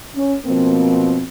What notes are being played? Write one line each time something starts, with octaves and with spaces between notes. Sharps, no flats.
C#4
B2 F3 A#3 C4